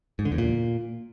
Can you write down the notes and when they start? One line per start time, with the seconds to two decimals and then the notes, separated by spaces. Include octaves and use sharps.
0.19 G#2
0.25 D3
0.32 E2
0.38 A#2